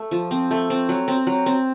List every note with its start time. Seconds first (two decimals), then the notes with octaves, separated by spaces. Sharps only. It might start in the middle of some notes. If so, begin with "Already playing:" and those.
Already playing: A3
0.11 F3
0.31 C4
0.51 A3
0.70 C4
0.89 F#3
1.08 C4
1.27 F#3
1.46 C4